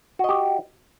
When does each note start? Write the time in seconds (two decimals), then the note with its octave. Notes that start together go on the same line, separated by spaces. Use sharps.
0.19 F#4
0.24 D#5
0.29 G4